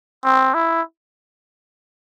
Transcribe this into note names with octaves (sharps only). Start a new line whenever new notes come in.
C4
E4